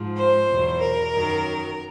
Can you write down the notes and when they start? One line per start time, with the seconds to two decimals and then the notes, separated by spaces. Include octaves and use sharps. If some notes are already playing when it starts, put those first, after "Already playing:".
Already playing: G#2 F3
0.17 C5
0.48 E2 B2 F#3
0.80 A#4
1.12 F#2 D#3 F#3